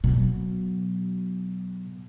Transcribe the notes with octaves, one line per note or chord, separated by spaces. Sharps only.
B2 F#3